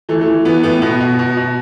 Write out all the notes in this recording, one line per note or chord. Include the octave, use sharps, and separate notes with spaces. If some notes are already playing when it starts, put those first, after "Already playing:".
E3 A3
A3
E3
E3 B3
A2 B3
B2 B3
B2
B2
B2